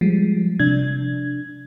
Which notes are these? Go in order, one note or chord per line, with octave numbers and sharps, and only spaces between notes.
F3 G3 G#3
C3 D4 G#6